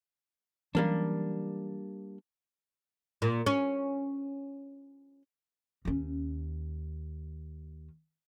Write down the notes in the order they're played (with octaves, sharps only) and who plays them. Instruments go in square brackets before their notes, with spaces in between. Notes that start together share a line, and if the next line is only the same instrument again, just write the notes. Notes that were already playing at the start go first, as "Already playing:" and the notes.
[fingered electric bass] E3 F#3 C#4 [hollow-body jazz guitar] G3 A#3 D4
[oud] A#2
C#4
[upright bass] D#2 C#4